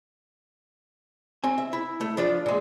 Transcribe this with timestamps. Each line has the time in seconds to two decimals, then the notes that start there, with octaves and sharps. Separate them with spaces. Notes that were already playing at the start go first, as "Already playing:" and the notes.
1.44 C4 G#5
1.58 E5
1.73 E4
2.01 A3
2.17 F3 D4 F4
2.46 A#2 G#3